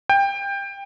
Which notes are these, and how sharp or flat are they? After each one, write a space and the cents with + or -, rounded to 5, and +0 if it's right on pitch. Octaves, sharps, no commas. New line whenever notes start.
G5 +20